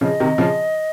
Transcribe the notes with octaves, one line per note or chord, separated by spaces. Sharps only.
C#3 F3 D#5
C3 D#3
C#3 F3